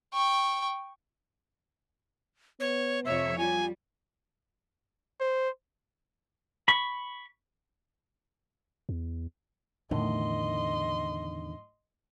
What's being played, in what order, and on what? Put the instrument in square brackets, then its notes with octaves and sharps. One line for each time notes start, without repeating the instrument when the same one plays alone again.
[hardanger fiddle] G5 C#6
[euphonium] B3 [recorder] C#5
[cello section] F2 C3 C#5 [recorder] E5
[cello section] G3 [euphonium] F4 [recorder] G#5
[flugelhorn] C5
[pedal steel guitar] B5 C#6
[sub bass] E2
[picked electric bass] E2 D3 D#3 [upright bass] A2 F#3 [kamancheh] D#5 C6